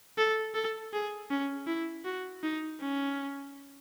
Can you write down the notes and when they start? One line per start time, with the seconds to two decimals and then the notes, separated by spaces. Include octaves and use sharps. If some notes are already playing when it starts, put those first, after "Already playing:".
0.18 A4
0.55 A4
0.93 G#4
1.31 C#4
1.67 E4
2.05 F#4
2.43 D#4
2.80 C#4